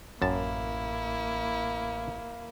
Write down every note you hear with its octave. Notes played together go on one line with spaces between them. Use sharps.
A1 F#2 A#3 E4 A5